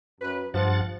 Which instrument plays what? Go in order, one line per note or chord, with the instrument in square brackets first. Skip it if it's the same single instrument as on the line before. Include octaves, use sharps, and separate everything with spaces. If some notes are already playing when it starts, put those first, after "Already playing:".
[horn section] F#2 B4
[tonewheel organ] G2 F#5 A6 [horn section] F3